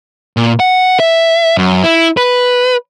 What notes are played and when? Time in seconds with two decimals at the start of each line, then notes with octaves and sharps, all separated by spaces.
0.37 A#2
0.60 F#5
1.00 E5
1.57 F#2
1.84 E4
2.17 B4